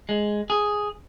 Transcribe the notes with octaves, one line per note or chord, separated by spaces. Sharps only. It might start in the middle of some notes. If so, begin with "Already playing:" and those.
G#3
G#4